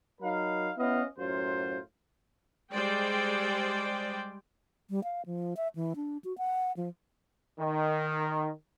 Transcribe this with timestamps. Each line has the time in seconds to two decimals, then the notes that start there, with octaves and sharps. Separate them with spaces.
0.21 F#3 D#4 A#4 F5 B5
0.77 B3 C#4 E4 D#5 F5
1.18 F#2 A2 F#3 F4 C5
2.73 G3 G#3 C5 D5 G5
4.90 G3
5.04 F5
5.26 F3
5.57 E5
5.75 E3
5.96 D4
6.24 F#4
6.38 F#5
6.77 F3
7.60 D#3